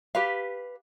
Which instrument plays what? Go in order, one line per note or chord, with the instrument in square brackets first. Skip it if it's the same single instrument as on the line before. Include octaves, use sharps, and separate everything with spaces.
[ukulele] G4 B4 F5